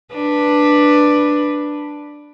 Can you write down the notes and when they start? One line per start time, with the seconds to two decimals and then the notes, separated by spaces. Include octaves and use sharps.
0.13 D4 B4